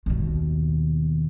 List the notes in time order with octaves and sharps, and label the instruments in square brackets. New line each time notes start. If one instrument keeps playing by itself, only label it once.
[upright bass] D#2 B2